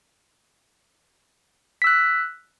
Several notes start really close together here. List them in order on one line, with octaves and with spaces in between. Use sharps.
B6 E6 F#6